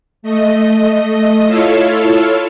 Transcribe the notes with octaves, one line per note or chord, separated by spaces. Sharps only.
A3 D#5
E4 F4 A4 C#5 E5 F5